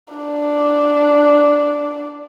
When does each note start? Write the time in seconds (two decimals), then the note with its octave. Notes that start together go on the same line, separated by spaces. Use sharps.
0.14 D4 D5